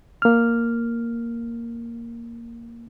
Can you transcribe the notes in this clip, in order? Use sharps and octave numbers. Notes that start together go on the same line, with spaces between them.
A#3 F6